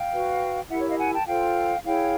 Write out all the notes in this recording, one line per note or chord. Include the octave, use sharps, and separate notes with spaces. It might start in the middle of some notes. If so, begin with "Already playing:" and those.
Already playing: F5 G5
F#4 B4
E4 G4 A#4 E5 F#5
C#5
D#5 F5
F#5 G#5
G5 A5
F4 A4 C5 F5 G5
E4 G#4 C#5 F5 G5